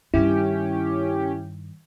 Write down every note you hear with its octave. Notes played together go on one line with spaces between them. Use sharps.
G2 D#3 C#4 E4 G4